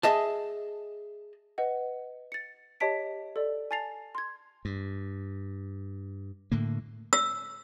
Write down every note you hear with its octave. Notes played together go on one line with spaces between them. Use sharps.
G#4 D#5 E5 A5
B4 D#5 F#5
A6 C#7
G4 C#5 D#5 A5 B6 D7
A4 D5
G#5 A5 A6 C7 F7
C6 G#6
G2
A2 D3 A#3
E6